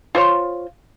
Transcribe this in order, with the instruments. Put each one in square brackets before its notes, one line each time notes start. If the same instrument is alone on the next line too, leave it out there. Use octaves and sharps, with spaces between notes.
[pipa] F4 C5 C#5